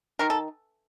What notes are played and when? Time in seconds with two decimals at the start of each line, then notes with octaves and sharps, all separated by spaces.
0.19 D#3 A#4
0.30 A4